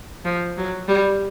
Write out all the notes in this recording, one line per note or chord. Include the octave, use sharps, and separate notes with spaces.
F3
F#3
G3